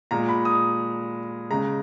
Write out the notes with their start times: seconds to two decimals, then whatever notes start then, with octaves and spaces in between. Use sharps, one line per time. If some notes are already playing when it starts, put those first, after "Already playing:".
0.11 A#2 G#3 A#5
0.29 B5
0.45 D#6
1.51 C#3 G#3 A#5